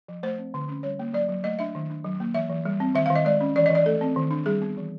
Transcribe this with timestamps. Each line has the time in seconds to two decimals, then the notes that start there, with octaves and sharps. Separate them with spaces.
0.08 F3
0.23 A3 C5
0.38 C4
0.54 D3
0.69 C#4
0.83 G3 C#5
0.99 A#3
1.13 F#3 D5
1.28 F#3
1.44 A3 D#5
1.59 D4 E5
1.75 D#3
1.90 D4
2.04 F#3
2.20 A#3
2.34 E3 E5
2.50 E3
2.65 G3
2.80 C4
2.95 D#3 E5
3.06 F5
3.10 D#3
3.15 D#5
3.25 G#3 D5
3.40 C#4
3.56 E3 D5
3.66 D#5
3.70 E3 D5
3.86 A3 A4
4.01 C4
4.16 D#3
4.31 D4
4.46 G3 G#4
4.61 B3
4.77 E3